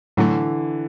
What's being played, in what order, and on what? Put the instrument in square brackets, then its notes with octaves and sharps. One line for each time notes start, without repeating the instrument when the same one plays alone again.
[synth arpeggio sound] A2 F#3 A3 [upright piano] D3 E3